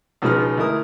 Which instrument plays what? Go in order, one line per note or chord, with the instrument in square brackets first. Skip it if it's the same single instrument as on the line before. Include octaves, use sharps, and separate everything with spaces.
[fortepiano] C#2 B2 F3 G#3 D#4 F6
D2 E4 A#4 D#6